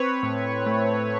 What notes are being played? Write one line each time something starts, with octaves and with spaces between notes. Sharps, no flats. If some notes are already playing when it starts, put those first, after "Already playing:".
Already playing: C4 B4 C#5
A2
A3